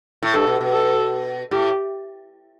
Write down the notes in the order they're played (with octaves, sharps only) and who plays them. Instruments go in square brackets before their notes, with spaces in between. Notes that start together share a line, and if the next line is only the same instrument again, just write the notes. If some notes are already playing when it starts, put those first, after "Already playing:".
[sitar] A2
[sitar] G2 [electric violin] A4
[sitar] B2
B2
[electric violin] A4
[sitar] A2 [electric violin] G4